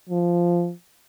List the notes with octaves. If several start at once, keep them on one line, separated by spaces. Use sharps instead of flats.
F3